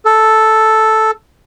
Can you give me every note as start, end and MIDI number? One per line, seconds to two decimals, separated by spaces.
0.05 1.11 69